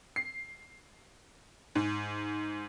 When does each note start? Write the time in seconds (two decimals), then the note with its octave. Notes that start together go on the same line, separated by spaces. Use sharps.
0.16 C7
1.75 G#2